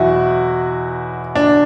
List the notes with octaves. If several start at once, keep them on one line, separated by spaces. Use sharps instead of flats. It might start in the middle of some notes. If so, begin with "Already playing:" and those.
Already playing: E2 B2 F#3 E4 F#4
D4